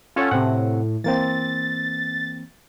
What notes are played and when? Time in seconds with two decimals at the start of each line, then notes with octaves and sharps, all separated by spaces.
0.16 C#4 F4 A4 C#5 F#5
0.31 A2 C3 C4 F#5
1.04 E3 A#3 C4 A6